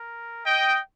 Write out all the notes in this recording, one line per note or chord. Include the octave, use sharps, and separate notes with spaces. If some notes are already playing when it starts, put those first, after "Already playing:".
Already playing: A#4
D#5 G5